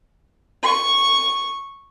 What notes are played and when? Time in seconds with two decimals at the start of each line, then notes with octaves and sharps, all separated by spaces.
0.62 C#6